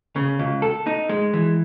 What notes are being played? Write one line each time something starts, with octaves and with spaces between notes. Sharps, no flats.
C#3
C#2
A4
D#4
G#3
E3